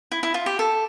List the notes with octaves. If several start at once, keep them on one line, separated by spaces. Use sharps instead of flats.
E4
E4
F4
G4
A4